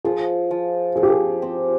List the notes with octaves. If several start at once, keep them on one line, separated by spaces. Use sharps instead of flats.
F3 G#4
F3
F3 G#4
G4
G#4
C4